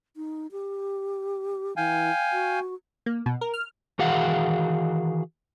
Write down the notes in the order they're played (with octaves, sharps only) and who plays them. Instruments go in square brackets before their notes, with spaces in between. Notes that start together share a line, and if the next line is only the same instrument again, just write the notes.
[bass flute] D#4
G4
[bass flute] E3 [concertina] F5 G5 G#5
[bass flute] F#4
[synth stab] A#3
B2
A#4
F6
[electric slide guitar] D#3 E3 F#4 G#4 F5 F#5